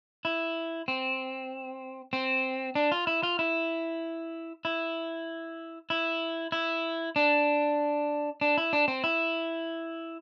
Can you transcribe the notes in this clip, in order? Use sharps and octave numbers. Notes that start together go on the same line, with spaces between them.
E4
C4
C4
D4
F4
E4
F4
E4
E4
E4
E4
D4
D4
E4
D4
C4
E4